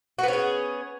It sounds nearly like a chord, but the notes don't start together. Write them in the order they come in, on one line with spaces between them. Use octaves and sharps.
F#4 B3 C#4 G#4